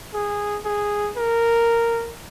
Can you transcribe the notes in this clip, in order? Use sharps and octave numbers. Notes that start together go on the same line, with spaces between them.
G#4
G#4
A#4